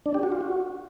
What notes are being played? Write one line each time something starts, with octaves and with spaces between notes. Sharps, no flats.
D4
G4
F#4
F4
F#4